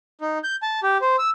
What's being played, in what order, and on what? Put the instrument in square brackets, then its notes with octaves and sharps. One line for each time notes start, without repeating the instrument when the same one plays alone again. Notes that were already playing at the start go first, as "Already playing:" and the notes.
[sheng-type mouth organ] D#4
G6
A5
G4
C5
E6